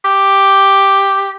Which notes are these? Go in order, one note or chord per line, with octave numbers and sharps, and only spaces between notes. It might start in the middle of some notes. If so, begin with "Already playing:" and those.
G4